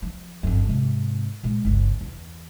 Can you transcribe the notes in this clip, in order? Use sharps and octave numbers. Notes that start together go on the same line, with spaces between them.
F3
G1 F2
G#2 C3
A#2 G#3
G1 C#2
E2